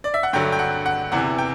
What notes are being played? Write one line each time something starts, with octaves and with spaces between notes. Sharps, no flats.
D5
E5
F#5
G2 D3 F#3 G5
G5
F#5
F#5
E2 C3 E3 F#5
G5